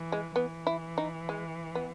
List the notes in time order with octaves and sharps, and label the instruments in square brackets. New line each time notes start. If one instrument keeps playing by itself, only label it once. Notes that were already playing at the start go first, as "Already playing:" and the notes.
Already playing: [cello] E3
[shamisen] G#3
[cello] E3 [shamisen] B3
[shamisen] E4
D#4
G#3
B3